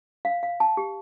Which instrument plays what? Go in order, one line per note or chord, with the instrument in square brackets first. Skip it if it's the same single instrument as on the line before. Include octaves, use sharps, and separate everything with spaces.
[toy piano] F5
F5
A5
G4